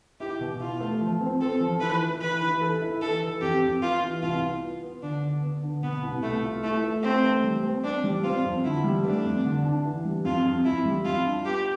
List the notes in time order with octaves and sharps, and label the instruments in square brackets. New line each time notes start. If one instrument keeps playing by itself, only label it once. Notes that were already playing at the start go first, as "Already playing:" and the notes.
[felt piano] E4 [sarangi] G4
[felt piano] B2
[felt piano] E4 [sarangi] F4
[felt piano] A3
F3
C4
[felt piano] C4 [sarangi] A4
[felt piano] F3
[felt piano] E3 [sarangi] B4
[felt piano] E3
[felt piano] E3 [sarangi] B4
[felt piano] E3
A4
E4
[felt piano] E3 [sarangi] A4
[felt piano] E3
[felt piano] F2 [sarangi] G4
[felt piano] F2
[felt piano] B3 [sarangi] F4
[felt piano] E3
[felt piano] C2 [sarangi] F4
[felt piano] B3
B3
B3
[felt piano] D3 [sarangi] D4
[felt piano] D3
B3
D3
[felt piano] B2 [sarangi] B3
[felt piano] C2
[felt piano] C2 [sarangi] A3
[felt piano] F4
[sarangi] A3 [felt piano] E4
[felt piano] A3
[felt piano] A3 [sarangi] C4
[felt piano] A3
G3
C4
[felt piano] C4 [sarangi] D4
[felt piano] G3
[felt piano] C4 [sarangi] F4
[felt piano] F2
[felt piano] D3 [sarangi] E4
[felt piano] G3
[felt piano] A3 [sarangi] D4
[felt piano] F2
D3
D4
E3
G3
[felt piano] F2 [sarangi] F4
[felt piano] F2
[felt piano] F2 [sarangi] E4
[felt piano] G3
[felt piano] F2 [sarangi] F4
[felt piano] D4
[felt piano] B3 [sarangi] G4